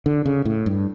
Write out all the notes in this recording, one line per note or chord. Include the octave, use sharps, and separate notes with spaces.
D3
C#3
A2
G2